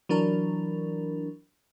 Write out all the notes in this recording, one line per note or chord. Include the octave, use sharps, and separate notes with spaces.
E3 F#3 D4 A#4